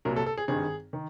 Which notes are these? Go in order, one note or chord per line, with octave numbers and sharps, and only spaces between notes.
C2 A#2 F#3 A#4
A4
A4
G#4
G#1 G2 D#3 G#4
D#3